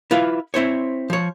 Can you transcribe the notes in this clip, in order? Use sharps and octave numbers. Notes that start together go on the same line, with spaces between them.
E4 F4 B4 F5
C4 E4 C5 C#5
F3 C#5